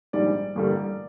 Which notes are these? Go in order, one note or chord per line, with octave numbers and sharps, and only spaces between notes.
A#1 G#2 D#3 G3 D5
A1 G2 D3 G3 A#3